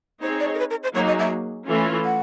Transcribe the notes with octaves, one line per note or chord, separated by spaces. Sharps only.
C4 D#4 G#4 C5 C#5
D5
A#4
B4
A#4
C5
F#3 A#3 D#4 G#4 C#5
D#5
E5
E3 A3 C#4 F4
F#5